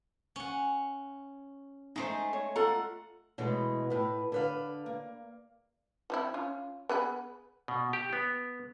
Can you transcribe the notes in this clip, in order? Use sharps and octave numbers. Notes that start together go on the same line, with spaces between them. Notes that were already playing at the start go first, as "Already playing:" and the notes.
C#4 F#5
G#3 A3 D#4 C5
C#5
F4 A4 F#5 A#5
B2 E3 G#3 A3
A2 B4
D3 B4 F5
A#3
F3 C4 E4
C#4 F4
B3 G#4 B4
B2
G4
B3